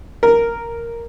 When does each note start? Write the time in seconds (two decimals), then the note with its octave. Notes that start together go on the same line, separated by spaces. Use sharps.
0.23 A#4